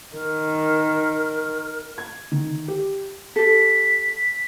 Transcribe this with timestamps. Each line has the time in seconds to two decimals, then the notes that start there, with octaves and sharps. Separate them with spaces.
0.14 D#3 A#4
1.98 G#6
2.32 D#3
2.68 G4
3.36 G4 A4 B6